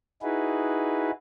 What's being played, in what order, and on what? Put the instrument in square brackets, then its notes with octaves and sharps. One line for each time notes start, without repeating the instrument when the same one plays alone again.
[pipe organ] D#4 E4 F#4 G#4 B4